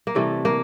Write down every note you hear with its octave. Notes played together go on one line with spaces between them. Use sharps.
A#3
C3 E3 G3 A3
A#3